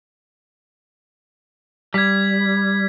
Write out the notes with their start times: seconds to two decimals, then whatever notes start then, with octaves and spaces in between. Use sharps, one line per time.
1.94 G3 G#6 B6